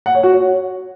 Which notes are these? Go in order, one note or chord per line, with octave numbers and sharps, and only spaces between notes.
F#5
C#5
F#4
C#5